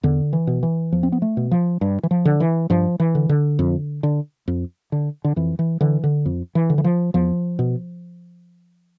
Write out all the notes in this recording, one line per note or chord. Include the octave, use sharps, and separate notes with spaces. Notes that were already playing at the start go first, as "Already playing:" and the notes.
E2 D3
E3
B2
E3
E2 F3
C4
B3
A3
B2
F3
G2
E3
F3
D3
E3
G2 F3
E3
D3
D3
F2
D3
F2
D3
D3
F2 E3
E3
D3 E3
D3
F2
E3
D3
E3
F3
E2 F3
B2